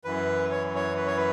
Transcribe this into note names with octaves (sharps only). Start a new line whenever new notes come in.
F#2 E3 B4
C#5
C#5
B4
C#5
B4